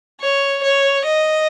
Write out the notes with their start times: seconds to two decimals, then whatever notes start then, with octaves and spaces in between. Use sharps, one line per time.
0.20 C#5
0.63 C#5
1.05 D#5